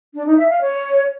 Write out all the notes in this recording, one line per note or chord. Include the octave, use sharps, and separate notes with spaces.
D4
D#4
E5
F5
C#5